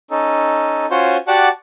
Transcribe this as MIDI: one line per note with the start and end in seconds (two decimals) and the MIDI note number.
0.11 0.86 61
0.11 0.86 63
0.11 0.86 69
0.91 1.17 61
0.91 1.17 65
0.91 1.17 66
0.91 1.17 72
0.91 1.17 73
1.28 1.49 66
1.28 1.49 67
1.28 1.49 74
1.28 1.49 78
1.28 1.49 81